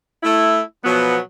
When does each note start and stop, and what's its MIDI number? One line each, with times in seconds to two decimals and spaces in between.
0.23 0.61 57
0.23 0.61 64
0.84 1.18 47
0.84 1.18 53
0.84 1.18 54
0.84 1.18 59